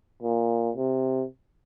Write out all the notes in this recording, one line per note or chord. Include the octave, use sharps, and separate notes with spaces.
A#2
C3